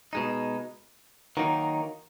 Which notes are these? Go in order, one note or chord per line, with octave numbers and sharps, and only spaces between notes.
B2 G#3 D#4
D#3 F#3 A#3 D#4